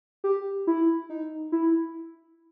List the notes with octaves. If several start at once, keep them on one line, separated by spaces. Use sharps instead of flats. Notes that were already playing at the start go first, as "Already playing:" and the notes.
G4
E4
D#4
E4